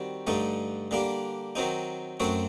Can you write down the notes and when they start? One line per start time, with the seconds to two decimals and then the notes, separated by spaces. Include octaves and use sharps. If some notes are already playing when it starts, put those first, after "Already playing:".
Already playing: D#3 G3 C4 F#4
0.27 G2 D3 A3 D#4
0.91 D3 G3 A#3 D4
1.55 D#3 F#3 C4 D#4
2.20 F#2 F#3 A3 C4 F#4